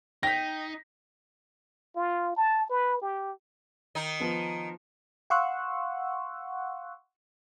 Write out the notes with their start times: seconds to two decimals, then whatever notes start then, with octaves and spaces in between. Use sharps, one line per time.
0.23 D#4 G5 A#6 B6
1.96 F4
2.37 A5
2.69 B4
3.02 G4
3.95 D#3 D#4
4.20 F3 B3
5.30 F5 F#5 C6 C#6 E6 F#6